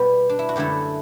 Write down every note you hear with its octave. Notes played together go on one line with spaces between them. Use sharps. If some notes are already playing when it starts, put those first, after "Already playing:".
Already playing: B2 G3 B3 G4 B4
D4
E4
F#4
F#2 D3 F#3 A3 E4 G4